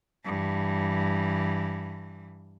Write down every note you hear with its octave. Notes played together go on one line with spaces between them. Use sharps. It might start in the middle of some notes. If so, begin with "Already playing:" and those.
G2 E3